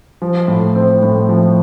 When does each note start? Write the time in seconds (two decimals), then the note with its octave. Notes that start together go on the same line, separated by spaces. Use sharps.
0.22 F3
0.48 A2
0.75 C4
1.03 A2
1.29 F3